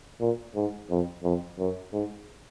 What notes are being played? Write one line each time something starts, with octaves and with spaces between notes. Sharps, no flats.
A#2
G#2
F2
F2
F#2
G#2